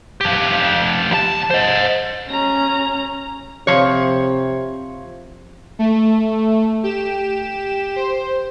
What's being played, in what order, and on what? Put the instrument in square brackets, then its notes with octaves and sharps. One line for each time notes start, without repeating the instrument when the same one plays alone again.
[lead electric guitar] F3 G4
D#2 A5
C5 D#5
[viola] C#4 A#5
[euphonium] C3 [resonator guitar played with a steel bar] F3 C#5
[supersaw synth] A3
G4 E7
C5